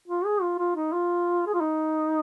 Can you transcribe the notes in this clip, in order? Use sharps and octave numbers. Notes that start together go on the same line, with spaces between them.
F4
G#4
F4
F4
D#4
F4
G#4
F4
D#4